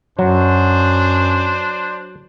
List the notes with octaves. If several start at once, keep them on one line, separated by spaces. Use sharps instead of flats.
F#2 F#3 D4 C5